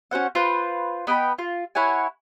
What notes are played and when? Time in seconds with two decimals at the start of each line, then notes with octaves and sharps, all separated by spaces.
0.11 C#4 F#4 C5 F#5
0.35 F4 B4 C5
1.07 B3 D#5 G5 B5
1.39 F4
1.75 E4 C#5 F#5 G#5